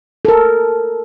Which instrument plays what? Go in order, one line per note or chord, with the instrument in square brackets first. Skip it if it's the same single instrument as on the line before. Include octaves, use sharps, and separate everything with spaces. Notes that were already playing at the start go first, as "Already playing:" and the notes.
[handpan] A4 A#4